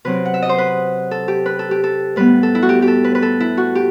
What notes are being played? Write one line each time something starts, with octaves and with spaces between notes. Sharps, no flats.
C3 F#3 C4 B4
F#5
E5
D#5
C5
B4
A4
G4
B4
A4
G4
A4
A2 G3 B3 B4
A4
E4
F#4
G4
G4
A4
B4
B4
A4
E4
F#4
G4